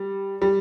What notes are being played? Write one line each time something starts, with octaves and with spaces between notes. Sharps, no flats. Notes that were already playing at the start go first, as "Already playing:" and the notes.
Already playing: G3
G3